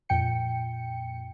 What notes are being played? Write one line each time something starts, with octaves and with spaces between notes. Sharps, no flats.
F2 A#2 G5 C#7